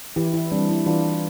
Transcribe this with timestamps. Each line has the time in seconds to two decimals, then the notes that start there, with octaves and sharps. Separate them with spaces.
0.16 E3 E4 G4
0.34 E4
0.52 G3 C4 D4
0.69 E4
0.86 E3 D4 F4